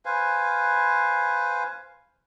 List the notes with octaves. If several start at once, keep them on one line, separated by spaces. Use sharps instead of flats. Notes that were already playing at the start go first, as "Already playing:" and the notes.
B4 C5 F5 G#5